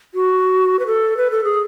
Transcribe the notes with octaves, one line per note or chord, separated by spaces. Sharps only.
F#4
B4
A4
B4
A4
G#4